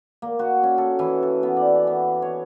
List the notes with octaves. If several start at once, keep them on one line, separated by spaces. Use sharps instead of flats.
A#3
F#4
C#4
A4
E3
A4
B3
D5
B3
C#5